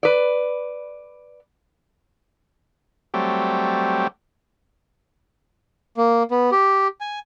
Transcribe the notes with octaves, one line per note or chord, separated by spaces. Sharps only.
B4 D5
F#3 G3 A3 C4 G4
A#3
B3
G4
G#5